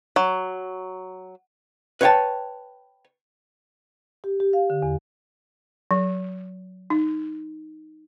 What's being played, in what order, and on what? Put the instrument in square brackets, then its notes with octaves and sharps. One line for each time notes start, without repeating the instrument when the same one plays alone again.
[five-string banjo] F#3
[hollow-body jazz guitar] B4 C#5 F5 G5 A5
[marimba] G4
G4
F5
D3
E2
[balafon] F#3
D#4